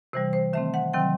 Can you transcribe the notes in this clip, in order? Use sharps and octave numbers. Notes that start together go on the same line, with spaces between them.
C3 E3 G3 C5
C5
D#3 A3 C4 E5
F#5
C3 D#3 F#3 C4 G5